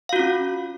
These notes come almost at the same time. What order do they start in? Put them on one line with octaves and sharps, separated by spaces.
F5 F#4 F4 C#4